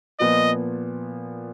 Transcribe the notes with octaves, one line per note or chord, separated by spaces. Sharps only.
A#2 F3 B3 F4 D#5